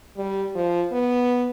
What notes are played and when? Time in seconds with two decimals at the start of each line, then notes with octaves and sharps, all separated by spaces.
0.17 G3
0.55 F3
0.92 B3